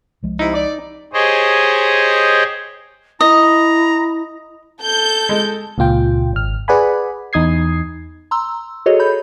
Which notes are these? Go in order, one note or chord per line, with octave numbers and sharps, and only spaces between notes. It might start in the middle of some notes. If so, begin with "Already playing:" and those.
C2 F3 G#3
C3 D#4 E4
D5
G4 G#4 C5 C#5 D#5
E4 D#5 A#5
A4 G6
G#3
C#2 A#2 F4 G5
G#1 F6
G#4 B4 D5 F#5 G#5 B5
E2 D#4 D#6 G#6 C7
A#5 C6 E6
F#4 G#4 A4 C#5 D#5
B5 G6